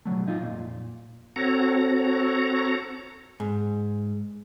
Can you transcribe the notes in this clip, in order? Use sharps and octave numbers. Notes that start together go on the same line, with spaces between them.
B1 G#2 F#3 A3
A#2 D#4 F4
F2 A#2
C4 F#4 A4 C#5 A#5
G#2